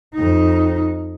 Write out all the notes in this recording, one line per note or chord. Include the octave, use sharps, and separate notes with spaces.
F2 D#4